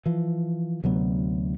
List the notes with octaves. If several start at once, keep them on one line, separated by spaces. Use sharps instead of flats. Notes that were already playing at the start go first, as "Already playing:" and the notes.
E3 F3
D2 C3 F#3 B3